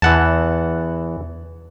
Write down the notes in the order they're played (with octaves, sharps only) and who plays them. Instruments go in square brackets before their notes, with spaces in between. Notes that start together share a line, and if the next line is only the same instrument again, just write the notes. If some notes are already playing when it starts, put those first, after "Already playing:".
[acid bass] E2 [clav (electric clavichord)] E3 F#5 A5